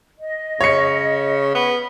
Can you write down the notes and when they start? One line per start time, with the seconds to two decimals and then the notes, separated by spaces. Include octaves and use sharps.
0.19 D#5
0.61 C#3 C#5 C#7
1.55 B3